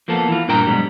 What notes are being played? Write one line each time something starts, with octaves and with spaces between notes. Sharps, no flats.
F3 A#3 B3 A4
E3 F4
G2 A#2 D4 A#4 G5 A#5
G#2 B2 D3 F#3 G3